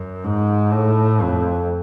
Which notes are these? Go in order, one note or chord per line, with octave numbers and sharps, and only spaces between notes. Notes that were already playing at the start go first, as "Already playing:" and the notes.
Already playing: F#2
G#2
A2
F2